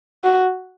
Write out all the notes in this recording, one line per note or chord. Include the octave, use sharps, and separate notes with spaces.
F#4